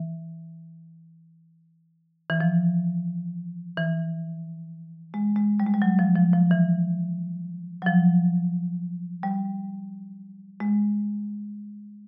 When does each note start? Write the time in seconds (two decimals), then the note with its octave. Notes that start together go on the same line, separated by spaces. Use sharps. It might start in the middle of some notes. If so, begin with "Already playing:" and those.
Already playing: E3
2.30 E3
2.40 F3
3.77 E3
5.14 G#3
5.36 G#3
5.60 G3
5.67 G#3
5.74 G3
5.82 F#3
5.99 F3
6.16 F3
6.33 F3
6.51 E3
7.82 F#3
7.86 F3
9.23 G3
10.60 G#3